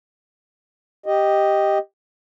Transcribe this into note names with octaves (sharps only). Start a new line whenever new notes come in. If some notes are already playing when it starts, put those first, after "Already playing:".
G4 D#5